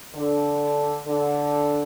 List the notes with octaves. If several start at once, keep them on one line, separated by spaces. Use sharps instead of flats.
D3
D3